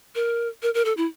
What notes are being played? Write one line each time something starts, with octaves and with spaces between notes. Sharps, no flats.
A#4
A#4
A#4
A4
E4